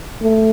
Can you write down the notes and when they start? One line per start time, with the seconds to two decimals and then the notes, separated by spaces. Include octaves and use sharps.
0.22 A3